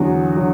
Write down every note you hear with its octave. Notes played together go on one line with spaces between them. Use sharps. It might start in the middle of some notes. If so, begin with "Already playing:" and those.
Already playing: E2 D3 F#3 F#4
D3 F#3